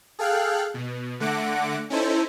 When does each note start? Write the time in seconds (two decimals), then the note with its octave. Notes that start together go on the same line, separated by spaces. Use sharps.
0.19 G#4 A4 F5 G5 F6 F#6
0.74 B2
1.20 D3 A3 F#5 D6 A#6 C#7
1.90 C#4 D#4 E4 A4 C5